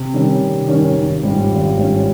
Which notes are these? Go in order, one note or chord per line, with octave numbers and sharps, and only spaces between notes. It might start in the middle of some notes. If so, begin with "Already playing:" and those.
Already playing: C3
D#3 G3 C#4
C3
D#3 G3 C#4
G#1
G#2 G3 C#4 F4
G#1
G#2 G3 C#4 F4